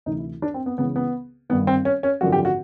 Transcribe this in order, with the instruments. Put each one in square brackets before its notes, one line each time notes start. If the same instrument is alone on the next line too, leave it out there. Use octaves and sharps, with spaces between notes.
[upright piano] D2 C3 E3 D#4
E4
D4
C4
B3
C#2 C#3 E3 B3
B3
G1 G2 D#3 B3
C4
C#4
C#4
G#1 F#2 D3 F3 F#4
G4
F#4